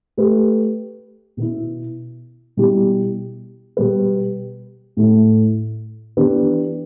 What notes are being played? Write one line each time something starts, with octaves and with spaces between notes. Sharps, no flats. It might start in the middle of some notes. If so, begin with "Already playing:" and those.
A3 G4 B4
B2 B3 E4
B2 G3 E4 G4
B2 G3 B3 G4 B4
A2 A3 E4
E3 B3 D4 G4 B4